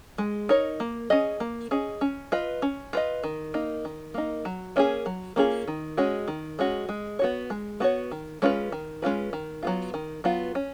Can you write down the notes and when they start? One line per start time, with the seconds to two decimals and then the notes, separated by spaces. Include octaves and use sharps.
0.18 G#3
0.49 D#4 A#4 C#5
0.80 A#3
1.10 C#4 G#4 D#5
1.40 A#3
1.71 C#4 G#4 D#5
2.01 C#4
2.32 F4 B4 D#5
2.62 C#4
2.93 F4 B4 D#5
3.24 D#3
3.54 A#3 D#4
3.85 D#3
4.14 A#3 D#4
4.45 F#3
4.76 A#3 C#4 F4 G#4
5.06 F#3
5.36 A#3 C#4 F4 G#4
5.68 D#3
5.97 G#3 C#4 F#4
6.28 D#3
6.59 G#3 C#4 F#4
6.89 G#3
7.19 B3 F#4 C#5
7.50 G#3
7.80 B3 F#4 C#5
8.11 D#3
8.42 G#3 C#4 F4 B4
8.72 D#3
9.02 G#3 C#4 F4 B4
9.33 D#3
9.63 F#3 B3 F4
9.94 D#3
10.24 F#3 B3 F4
10.55 C#4